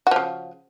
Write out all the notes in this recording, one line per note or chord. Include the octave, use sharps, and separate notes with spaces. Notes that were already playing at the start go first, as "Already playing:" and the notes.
C#3 F3 F#4